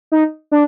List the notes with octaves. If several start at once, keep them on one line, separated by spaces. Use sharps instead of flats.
D#4
D4